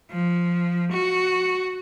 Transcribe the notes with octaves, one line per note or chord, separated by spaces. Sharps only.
F3
F#4